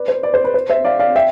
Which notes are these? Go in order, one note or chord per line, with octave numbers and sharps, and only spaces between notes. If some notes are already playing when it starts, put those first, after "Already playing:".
Already playing: B4 D5
C5
B4 D5
C5
B4
C5
C5 E5
D5 F5
D5 F5
E5 G5